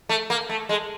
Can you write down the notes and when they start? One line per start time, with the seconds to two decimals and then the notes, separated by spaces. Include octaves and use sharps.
0.09 A3
0.30 A#3
0.49 A3
0.69 G#3